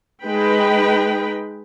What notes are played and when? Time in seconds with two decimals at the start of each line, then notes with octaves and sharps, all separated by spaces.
0.23 G#3 D#4 B4 G5 B5